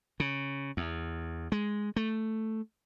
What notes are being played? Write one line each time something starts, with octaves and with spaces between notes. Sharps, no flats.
C#3
E2
G#3
A3